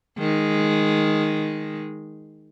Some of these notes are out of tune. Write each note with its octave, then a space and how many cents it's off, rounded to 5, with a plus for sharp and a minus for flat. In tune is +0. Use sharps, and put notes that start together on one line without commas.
D#3 +0 G#3 +0